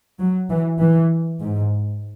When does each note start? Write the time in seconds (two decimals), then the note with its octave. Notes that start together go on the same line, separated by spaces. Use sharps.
0.19 F#3
0.50 E3
0.80 E3
1.40 G#2